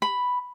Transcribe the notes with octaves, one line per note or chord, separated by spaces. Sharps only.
B5